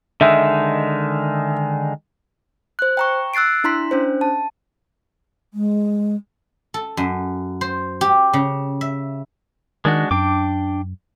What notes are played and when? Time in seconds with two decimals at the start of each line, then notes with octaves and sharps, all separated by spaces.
0.21 D3 D#3 G#3 E5
2.79 C5 F#6
2.97 G5 A#5 C#6
3.34 E6 F#6 A6 C7 D7
3.64 D4 E4 A#5 C6 B6
3.91 C#4 D4 C5
4.21 A5
5.54 G#3
6.74 A4
6.97 F#2
7.61 C5
8.01 G4
8.33 C#3
8.81 E5
9.85 D#3 G#3 D4 F#4
10.11 F#2 D4 G5 D6